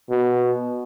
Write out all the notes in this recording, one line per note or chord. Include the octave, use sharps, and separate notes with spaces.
B2